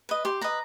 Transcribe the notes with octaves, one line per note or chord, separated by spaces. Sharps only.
B4 D#5
G4 C6
B4 D#5 A#5